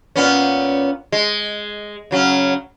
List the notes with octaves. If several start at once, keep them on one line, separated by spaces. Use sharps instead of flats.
A#2 B3 C#4
G#3
C#3 F#3 C#4